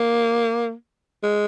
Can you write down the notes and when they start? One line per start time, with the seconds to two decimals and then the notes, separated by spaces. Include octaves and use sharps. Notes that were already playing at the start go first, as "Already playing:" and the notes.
Already playing: A#3
1.23 G#3